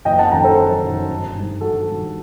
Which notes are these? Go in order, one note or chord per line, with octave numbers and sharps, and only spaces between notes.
F#1 D#5 G5
F#5 A5
F#2 D#3 F#3 G5 A#5
A4 C5
F#1
F#2 D#3 F#3
G1
G2 D#3 G3
G1 F#4 A4
G2 D#3 G3